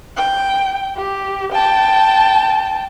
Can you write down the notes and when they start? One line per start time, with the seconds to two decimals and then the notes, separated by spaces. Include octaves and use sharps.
0.17 G5
0.96 G4
1.53 G5 A5